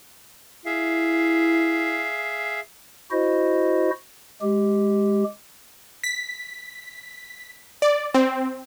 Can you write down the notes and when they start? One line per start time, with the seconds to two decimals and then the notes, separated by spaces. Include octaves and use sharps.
0.66 E4 G#4 E5 F5
3.11 E4 F#4 C5 D#5
4.42 G#3 G4
6.04 B6
7.82 D5
8.14 C4